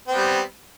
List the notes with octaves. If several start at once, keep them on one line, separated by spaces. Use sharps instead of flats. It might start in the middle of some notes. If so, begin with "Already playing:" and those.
G3 B3 C4